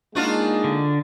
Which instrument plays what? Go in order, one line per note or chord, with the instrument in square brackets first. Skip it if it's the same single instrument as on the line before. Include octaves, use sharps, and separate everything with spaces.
[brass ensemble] G#3 A#3 D#4 [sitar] D4 F4 F#4
[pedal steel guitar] D3